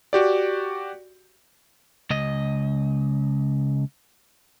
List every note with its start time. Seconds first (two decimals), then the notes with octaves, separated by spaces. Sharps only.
0.13 F#4 G4 D5
2.10 C#2 D#5